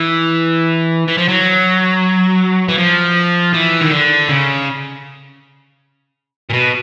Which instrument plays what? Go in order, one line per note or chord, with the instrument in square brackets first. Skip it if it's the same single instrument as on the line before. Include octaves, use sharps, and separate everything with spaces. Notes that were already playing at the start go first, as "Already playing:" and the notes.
Already playing: [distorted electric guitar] E3
E3
F3
F#3
E3
F3
E3
D#3
D3
C#3
A#2
B2